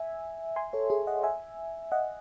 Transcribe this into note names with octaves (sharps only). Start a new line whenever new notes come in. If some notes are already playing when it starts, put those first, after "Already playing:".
Already playing: E5 G#5
G#5 C6
A4 C#5
G#4
D#5 F#5
E5 G#5
D#5 F#5